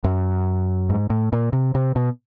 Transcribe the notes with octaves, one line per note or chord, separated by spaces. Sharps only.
F#2
G#2
A2
A#2
C3
C3
B2